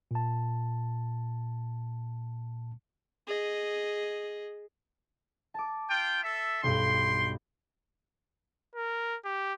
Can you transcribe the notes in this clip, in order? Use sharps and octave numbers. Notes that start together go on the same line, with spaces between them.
A#2 A5
G#4 D#5
A5 D6
F4 G5
A4 E5
B1 G2 G5 C6
A#4
G4